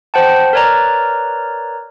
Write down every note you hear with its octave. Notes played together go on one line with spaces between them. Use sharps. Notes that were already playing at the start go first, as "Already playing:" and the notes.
C5 F#5 G5 A5
A#4 B4 C#5 D5 A#5